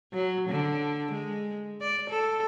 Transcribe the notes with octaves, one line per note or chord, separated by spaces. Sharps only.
F#3
D3
G#3
D5
A4